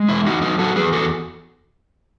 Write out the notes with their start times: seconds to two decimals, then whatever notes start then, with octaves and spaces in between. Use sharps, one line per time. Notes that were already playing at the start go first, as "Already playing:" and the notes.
Already playing: G#3
0.09 E2 E4
0.26 D#4 F#4
0.42 F#3 D#4 F#4
0.59 F#4 A4
0.76 E2 G#4 B4
0.93 F#4 A4